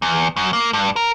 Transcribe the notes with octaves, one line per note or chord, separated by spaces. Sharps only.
E2
F#2
A#3
G2
A#4